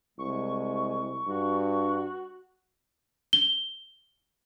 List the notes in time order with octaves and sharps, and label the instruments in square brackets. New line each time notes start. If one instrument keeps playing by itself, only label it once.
[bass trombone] C2 [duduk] G#3 [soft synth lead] C#6
[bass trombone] G2 [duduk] F#4
[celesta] G7